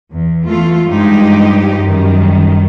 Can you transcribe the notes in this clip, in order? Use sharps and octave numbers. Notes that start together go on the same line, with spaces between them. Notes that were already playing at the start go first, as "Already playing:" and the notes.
E2
E3 A3 F4
G2 F3 G3 G#3 D#4 G4
F#2 D#3 G3